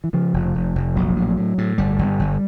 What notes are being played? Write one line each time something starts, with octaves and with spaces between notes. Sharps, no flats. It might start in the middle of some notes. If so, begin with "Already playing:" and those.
E3
C#3 F3
F1
F1
F1
A#1 F#3
A2
A2
A2
G1 G3
G1
G1